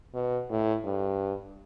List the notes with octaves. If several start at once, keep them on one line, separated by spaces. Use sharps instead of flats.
B2
A2
G2